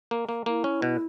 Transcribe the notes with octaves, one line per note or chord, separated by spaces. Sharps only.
A#3
A#3
A#3 E4
C#4
B2